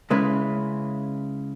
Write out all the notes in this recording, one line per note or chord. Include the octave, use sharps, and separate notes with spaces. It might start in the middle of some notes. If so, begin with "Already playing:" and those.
C#3 G#3 C#4 E4 B4